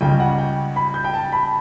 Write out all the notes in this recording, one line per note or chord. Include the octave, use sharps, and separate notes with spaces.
C#2 C#3 G3 G5
F#5
G5
B5
G6
G5
A5
B5